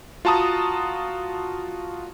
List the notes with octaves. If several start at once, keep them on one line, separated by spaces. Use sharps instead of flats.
F4 F#4 A5 A#5 D#6